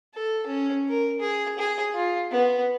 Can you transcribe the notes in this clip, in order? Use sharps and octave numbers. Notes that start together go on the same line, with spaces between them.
A4
C#4
A#4
G#4
G#4
F4
B3